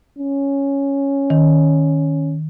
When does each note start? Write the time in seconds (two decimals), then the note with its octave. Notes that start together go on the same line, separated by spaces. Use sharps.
0.19 C#4
1.30 D#3